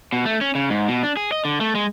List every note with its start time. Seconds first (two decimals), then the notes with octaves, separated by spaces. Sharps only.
0.13 B2
0.26 A3
0.41 C#4
0.55 C#3
0.70 G#2
0.88 B2
1.03 D4
1.17 G#4
1.32 D#5
1.45 D3
1.61 A3
1.75 G#3